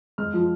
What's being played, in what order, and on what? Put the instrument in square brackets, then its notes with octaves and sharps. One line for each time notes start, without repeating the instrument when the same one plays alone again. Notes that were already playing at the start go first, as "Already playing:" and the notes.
[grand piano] G#3 F6
F3